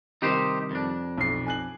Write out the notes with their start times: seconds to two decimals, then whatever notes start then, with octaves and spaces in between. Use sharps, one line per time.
0.22 C3 D#3 G3 D#4 G4 C5
0.71 F2 D4
1.18 B1 C7
1.47 G#5 F#6 F#7